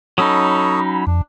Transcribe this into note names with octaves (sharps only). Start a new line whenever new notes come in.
F#3 C#4 D#4 A4 B5 C#6 D#6
F2 D4